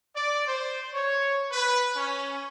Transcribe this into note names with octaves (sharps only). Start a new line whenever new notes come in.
D5
C5
C#5
B4
C#4